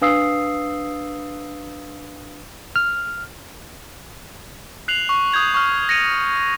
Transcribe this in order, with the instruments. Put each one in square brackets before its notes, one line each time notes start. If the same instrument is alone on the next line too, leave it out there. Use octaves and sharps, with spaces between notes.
[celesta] D4 B4 F5 D#6 E6 C7
[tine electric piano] F6
[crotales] F#6 C7 F7 F#7
C#6
D#6 G6 G#6 F7
C#6 F6
A#6 C#7 D#7 F7